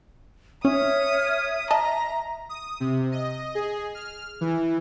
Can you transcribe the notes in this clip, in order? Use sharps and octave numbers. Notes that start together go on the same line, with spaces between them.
C#4 C#5 E5 D#6 F6
D#5 A5 A#5 D#6
D#6
C3
D#5
G#4
F6
E3